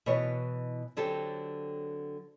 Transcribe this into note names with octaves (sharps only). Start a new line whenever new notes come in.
B2 E3 F#4 C#5
D3 F#3 C4 G4 A4